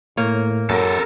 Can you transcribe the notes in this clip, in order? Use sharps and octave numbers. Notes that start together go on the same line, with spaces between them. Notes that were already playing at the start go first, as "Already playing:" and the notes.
A2 A#3 C#5
F#2 A4 A#4